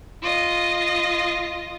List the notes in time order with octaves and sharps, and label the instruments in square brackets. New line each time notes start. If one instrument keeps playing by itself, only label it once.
[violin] F4 D#5